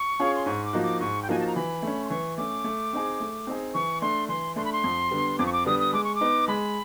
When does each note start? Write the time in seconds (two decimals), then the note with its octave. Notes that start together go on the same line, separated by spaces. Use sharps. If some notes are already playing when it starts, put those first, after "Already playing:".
Already playing: C#6
0.20 C#4 F4 G#4 C#5
0.35 C6
0.46 G#2 C#6
0.64 D6
0.73 F3 A#3 D#4 F#4
0.82 D6
1.00 G#2 C#6
1.22 G5
1.29 F3 A#3 D#4 F#4 G#5
1.39 A5
1.47 A#5
1.55 E3 B5
1.83 A3 C#4
2.05 C6
2.10 E3 C#6
2.37 A3 C#4 D6
2.64 A3
2.93 C4 D#4 G#4
3.20 A3
3.47 C4 D#4 G#4
3.74 E3 C#6
4.01 A3 D4 C6
4.29 E3 C6
4.56 A3 D4 C6
4.65 B5
4.72 C6
4.84 F2
5.11 D3 G3 B3
5.39 F2 D6
5.46 C#6
5.52 D6
5.65 D3 G3 B3 D#6
5.79 D#6
5.93 G#3 D6
6.04 C#6
6.15 D6
6.21 B3 D#4
6.48 G#3 B5